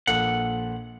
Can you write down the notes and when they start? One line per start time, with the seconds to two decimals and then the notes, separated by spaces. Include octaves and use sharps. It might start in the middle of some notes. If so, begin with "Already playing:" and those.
0.07 A#1 A#2 A4 F#5